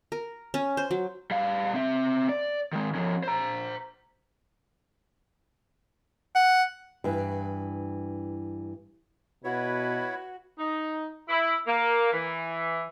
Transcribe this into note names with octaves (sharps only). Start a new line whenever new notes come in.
A#4
C#4
C5
F#3
G3 F5
C4 E5
D5
D#3 G#3
F3 C#4
C5 A#5
F#5
G2 E3
B2 E4 F#4 B4 C#5
D#4
E4
A#3
E3